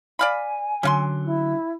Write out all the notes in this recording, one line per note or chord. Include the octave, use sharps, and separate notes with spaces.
D5 F5 G#5 B5
D3 F#3 C#4 F5 C6
E4